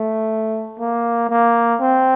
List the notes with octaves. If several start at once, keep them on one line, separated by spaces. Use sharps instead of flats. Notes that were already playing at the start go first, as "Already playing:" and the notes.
Already playing: A3
A#3
A#3
C4